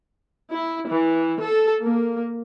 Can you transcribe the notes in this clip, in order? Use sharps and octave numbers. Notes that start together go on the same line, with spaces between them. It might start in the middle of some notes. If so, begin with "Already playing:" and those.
E4
E3
A4
A#3